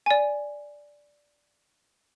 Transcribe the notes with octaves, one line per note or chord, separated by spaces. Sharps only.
D5 G#5